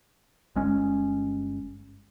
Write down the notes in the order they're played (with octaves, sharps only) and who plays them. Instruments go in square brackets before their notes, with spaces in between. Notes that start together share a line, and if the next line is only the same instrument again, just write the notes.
[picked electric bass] G1 G#3 C#4